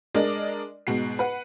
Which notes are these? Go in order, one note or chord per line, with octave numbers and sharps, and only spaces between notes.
G#3 D4 A#4 D5 D#5
G#2 B2 F#4 C7
B4 F#5